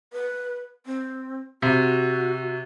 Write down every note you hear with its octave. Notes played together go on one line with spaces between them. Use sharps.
B4
C4
C3 F#4